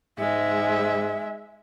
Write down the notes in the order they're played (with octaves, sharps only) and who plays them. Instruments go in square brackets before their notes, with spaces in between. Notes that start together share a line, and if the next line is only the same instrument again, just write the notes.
[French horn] G#2 [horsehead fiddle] G#3 E5